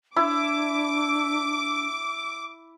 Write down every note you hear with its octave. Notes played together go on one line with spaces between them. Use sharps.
D4 E4 D6